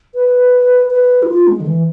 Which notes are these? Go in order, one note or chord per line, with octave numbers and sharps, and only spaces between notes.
B4
B4
E4
F4
G#3
D3
E3